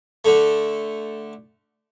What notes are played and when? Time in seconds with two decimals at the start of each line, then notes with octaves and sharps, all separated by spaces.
0.25 D3 A3